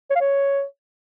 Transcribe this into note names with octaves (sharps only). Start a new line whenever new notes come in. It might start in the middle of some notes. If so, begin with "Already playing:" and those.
C#5
F5
C#5